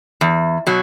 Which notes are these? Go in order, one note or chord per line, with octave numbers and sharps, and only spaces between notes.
E2
B2 F#3